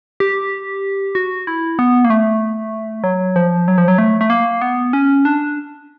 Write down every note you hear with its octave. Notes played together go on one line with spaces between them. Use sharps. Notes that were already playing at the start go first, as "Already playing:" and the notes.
G4
F#4
E4
B3
A#3
A3
F#3
F3
F#3
F3
F#3
A3
A3
A#3
B3
C#4
D4